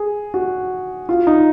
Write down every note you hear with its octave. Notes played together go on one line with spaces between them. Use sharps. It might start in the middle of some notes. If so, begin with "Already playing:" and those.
Already playing: G#4
F#4
F4
D#4